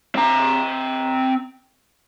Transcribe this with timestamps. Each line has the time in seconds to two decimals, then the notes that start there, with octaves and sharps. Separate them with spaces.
0.15 C4 A#5